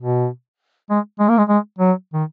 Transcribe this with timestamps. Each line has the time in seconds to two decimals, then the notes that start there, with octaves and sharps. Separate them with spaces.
0.01 B2
0.90 G#3
1.19 G#3
1.29 A#3
1.38 G#3
1.49 G#3
1.79 F#3
2.13 D#3